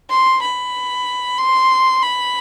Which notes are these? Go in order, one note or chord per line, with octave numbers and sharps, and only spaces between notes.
C6
B5
C6
B5